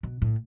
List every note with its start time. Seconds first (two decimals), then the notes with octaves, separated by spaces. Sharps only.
0.03 B2
0.22 A2